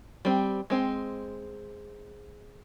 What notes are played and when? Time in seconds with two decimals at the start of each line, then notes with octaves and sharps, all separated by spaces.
0.25 G3 C4
0.70 G#3 C4